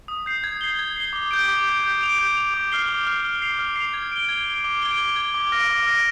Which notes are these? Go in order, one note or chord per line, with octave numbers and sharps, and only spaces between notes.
D#6
G6 C7
G#6
C7 G7
G#6
C7 G7
D6
G6 D7
D6
G6 D7
G6
D7 F7
G6
D7 F7
D6
F6 C7 G7
D6
F6 C7 G7
F6
C7 F7
F6
C7 F7
G#6
D7 G7
G#6
D7 G7
D6
G#6 D7 G7
D6
G#6 D7 G7
D6
F6 A#6 D7
D6
F6 A#6 D7